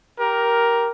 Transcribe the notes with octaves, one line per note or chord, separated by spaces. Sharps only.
G4 A#4